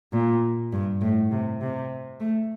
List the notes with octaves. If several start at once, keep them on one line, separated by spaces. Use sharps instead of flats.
A#2
G2
A2
C3
C3
A3